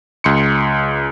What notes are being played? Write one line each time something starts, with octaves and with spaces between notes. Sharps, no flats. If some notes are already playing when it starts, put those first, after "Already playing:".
C#2 C6 C#7